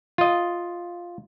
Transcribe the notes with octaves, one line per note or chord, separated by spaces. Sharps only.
F4 D#5